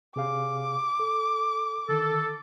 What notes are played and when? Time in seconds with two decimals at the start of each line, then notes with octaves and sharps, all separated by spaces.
0.16 C3 G#4 F5 D6
1.00 A4
1.89 D3 D#3 A4